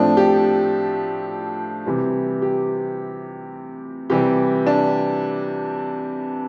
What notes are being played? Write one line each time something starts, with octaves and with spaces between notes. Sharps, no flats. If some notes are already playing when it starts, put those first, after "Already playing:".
Already playing: A2 F3 A3 C4 D4
G4
C3 E3 G3
G4
C3 E3 G3 G4
D4